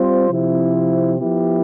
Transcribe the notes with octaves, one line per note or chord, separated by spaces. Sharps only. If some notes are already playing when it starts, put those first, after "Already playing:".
Already playing: G3 C4 F4 C5
C3 F3 C4 E4
F3 B3 E4 G4